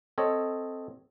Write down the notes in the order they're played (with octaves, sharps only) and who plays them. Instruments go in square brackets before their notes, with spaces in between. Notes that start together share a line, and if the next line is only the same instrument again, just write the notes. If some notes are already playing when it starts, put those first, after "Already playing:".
[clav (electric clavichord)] C4 A4 C#5 D#5